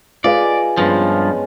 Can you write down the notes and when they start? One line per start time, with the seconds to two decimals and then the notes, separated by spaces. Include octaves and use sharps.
0.24 F4 G#4 B4 D5 D#5 F5
0.77 G2 F3 G#3 B3 C#4